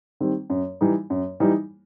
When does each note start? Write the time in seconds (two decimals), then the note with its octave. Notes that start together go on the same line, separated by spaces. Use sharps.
0.20 D#3 G3 C4
0.50 F#2
0.81 E3 G3 D#4
1.10 F#2
1.40 E3 G3 D#4